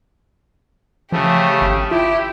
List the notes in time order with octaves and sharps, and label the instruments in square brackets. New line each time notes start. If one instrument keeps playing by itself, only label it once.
[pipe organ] C#3 A3 [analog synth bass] F3 [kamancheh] G4
[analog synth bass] G#1
[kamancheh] E4 G5 [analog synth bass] F4 [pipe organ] G4